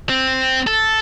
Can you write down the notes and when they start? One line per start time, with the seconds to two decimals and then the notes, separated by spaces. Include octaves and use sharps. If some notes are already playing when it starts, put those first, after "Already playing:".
0.09 C4
0.67 A4